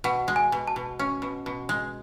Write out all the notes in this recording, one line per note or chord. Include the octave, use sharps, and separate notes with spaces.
B2 F#5
G#3
G#5
B2
A5
B2
C#4
B2
B2
G#3